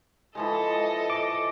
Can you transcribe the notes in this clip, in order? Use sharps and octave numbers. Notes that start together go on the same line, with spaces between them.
E3 F3 G#3 A4 D#5
D6